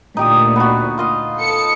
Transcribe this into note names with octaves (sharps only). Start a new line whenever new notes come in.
D2 A#2 D#4 G4 D#6
B3 F#4
F4 D#5 F5
A4 C#7